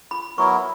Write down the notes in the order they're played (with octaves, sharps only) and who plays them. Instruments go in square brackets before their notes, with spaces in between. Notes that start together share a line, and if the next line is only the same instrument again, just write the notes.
[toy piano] B5
[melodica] F#3 B3 E4 A#4 [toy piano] C#6